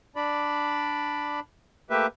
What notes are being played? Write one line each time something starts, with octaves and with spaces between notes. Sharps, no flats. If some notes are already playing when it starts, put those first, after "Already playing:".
D4 D5 B5
A3 A#3 G4 B4 E5